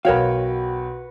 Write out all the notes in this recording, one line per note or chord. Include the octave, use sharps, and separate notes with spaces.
B1 F#4 A#4 B4 C#5 F5 G5